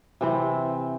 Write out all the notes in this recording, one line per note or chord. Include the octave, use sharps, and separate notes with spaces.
C3 E3 C4